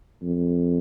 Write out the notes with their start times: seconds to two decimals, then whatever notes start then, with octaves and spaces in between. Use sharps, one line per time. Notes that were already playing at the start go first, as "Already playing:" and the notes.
0.22 F2